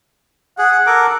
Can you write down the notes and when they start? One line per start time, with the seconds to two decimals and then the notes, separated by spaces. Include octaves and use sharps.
0.58 G#4 F#5
0.87 A4 A#4 D6